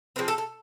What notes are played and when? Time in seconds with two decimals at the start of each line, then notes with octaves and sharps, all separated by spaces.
0.16 F3 G#3 C4 B4
0.28 A4
0.38 A4